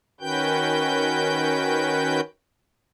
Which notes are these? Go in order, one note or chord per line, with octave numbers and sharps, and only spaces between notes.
D#3 C#4 F#4 B4 G5 G6